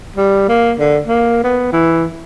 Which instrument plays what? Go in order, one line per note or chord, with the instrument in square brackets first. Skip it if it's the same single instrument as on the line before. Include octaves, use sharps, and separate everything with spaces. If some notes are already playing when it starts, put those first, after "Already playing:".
[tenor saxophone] G3
A#3
D3
A#3
B3
E3